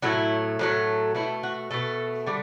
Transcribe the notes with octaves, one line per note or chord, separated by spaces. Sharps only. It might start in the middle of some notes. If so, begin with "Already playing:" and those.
A2 F#3 A3 E4
A2 F#3 A3
B2 A3 E4
F#4
B2 A3 A4
D3 G3